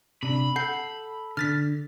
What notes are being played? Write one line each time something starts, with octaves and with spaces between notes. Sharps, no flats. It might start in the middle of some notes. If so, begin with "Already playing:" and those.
C3 D4 B5
A4 F#5 G6 C7
D3 F6 A6 B6